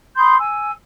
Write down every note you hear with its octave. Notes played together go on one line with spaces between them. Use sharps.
B5 C6 D#6 G6
G#5 E6